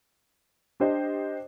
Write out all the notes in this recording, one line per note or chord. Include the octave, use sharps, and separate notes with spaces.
D4 G4 C5 D#5